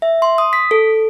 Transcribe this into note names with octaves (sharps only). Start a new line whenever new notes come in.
E5
C6
D#6
B6
A4